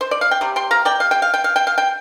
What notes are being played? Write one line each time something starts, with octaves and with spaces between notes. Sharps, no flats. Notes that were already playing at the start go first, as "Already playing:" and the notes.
C5
D5
F5
G5
C3 G3
G5 C6
F5 A#5
D5 G5
F5
G5
F5
G5
F5
G5
F5
G5